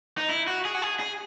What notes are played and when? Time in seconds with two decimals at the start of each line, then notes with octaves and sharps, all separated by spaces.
0.18 D#4
0.29 E4
0.48 F#4
0.65 G#4
0.75 F#4
0.82 G#4
1.00 G#4